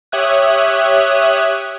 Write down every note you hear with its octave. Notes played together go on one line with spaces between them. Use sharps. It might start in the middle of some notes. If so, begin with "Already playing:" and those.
G4 C#5 E5 D#6 F#6